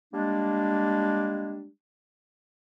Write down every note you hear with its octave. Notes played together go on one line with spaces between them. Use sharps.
G3 G#3 A#3 D4